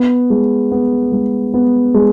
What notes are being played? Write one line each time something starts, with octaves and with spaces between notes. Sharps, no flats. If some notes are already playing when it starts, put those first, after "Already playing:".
Already playing: B3
G#3
B3
G#3
B3
G#3